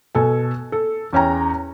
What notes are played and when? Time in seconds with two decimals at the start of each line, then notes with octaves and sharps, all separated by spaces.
0.15 B2 A4 G#5
0.72 A4
1.13 E2 C#4 G5 A#5